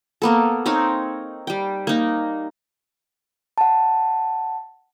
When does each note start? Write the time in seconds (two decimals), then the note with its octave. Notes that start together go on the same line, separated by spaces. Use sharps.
0.22 A#3 B3 A4
0.66 C4 D#4 C#5 F5
1.47 G3 G5
1.87 A#3 D#4
3.58 F#5 A5